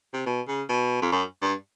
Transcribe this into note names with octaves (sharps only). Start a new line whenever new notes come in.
C3
B2
C#3
B2
F2
F#2
G2